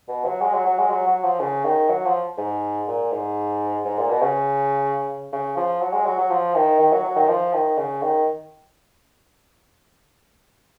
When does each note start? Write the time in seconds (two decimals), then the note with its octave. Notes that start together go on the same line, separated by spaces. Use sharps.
0.09 B2
0.26 F#3
0.42 G#3
0.54 F#3
0.66 F#3
0.79 G#3
0.91 F#3
1.07 F#3
1.24 F3
1.40 C#3
1.65 D#3
1.89 F#3
2.06 F3
2.38 G#2
2.87 A#2
3.12 G#2
3.85 G#2
3.98 A#2
4.10 B2
4.22 C#3
5.32 C#3
5.57 F3
5.82 F#3
5.93 G#3
6.06 F#3
6.18 F#3
6.31 F3
6.55 D#3
6.80 D#3
6.92 F#3
7.04 F#3
7.16 D#3
7.29 F3
7.54 D#3
7.77 C#3
8.02 D#3